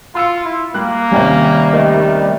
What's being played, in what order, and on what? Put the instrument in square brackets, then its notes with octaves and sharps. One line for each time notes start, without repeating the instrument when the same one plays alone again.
[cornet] F4 [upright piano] C6 E6 C#7
[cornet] E4
[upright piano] G3 F#6 [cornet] A#3
[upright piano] D#2 C3 C#4 [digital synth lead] G3
[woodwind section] D#3 A3